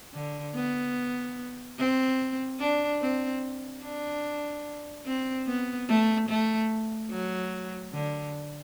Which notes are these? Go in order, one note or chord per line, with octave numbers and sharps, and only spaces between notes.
D3
B3
C4
D4
C4
D4
C4
B3
A3
A3
F#3
D3